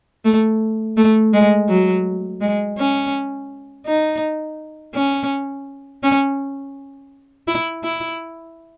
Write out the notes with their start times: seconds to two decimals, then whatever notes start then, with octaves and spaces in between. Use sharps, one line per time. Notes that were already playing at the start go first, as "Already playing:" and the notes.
0.25 A3
0.97 A3
1.34 G#3
1.69 F#3
2.41 G#3
2.78 C#4
3.86 D#4
4.94 C#4
6.03 C#4
7.48 E4
7.84 E4